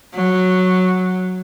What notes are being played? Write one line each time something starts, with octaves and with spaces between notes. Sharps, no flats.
F#3